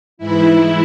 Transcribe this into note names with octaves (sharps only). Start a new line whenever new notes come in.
G#2 E3 E4